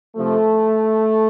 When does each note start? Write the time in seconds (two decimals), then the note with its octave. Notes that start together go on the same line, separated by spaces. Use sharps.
0.17 C3 F3 A3